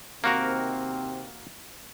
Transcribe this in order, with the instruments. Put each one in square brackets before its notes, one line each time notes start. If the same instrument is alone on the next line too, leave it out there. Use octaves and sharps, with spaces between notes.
[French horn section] C3 D#3 C4 [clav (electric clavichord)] A#3 F#4 A#4